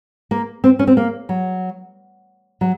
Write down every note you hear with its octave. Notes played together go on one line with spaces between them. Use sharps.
A#3
C4
C#4
C4
A#3
F#3
F#3